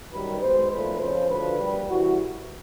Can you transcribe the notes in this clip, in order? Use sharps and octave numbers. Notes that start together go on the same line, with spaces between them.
F#2 D#3 G3 B4
B1 B2 G#3 C5
B1 A#2 F3 A3 B4
F2 C#3 F3 C5
D2 D3 F3 B4
A#1 A#2 G3
C2 C3 E3 F#4